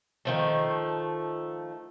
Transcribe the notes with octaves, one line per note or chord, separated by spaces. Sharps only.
D#3 F3 A3